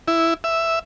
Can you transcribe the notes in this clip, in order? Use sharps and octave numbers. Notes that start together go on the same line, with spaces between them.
E4
E5